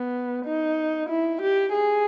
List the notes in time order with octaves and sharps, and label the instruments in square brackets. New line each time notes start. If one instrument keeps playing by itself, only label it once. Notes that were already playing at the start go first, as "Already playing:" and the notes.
Already playing: [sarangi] B3
D#4
E4
G4
G#4